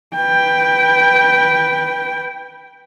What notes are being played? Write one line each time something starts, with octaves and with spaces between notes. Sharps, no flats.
B4 G5